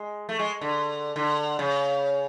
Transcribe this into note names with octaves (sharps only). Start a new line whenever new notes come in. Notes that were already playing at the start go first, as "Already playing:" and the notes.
Already playing: G#3
A3
G#3
D3
D3
C#3